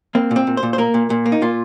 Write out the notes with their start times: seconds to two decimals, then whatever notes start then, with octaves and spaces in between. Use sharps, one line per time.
0.15 A#3 C4
0.31 A#2
0.36 C4
0.47 A#2
0.57 C5
0.63 A#2
0.73 C5
0.78 A#3 A#4
0.94 A#2
1.10 A#2
1.26 A#3
1.32 D#4
1.42 A#2 F4